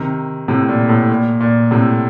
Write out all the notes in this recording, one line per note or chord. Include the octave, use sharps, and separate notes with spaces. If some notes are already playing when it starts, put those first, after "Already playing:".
Already playing: C3 D#3
A2 C3
A#2
A2
A#2
A#2
A2 C3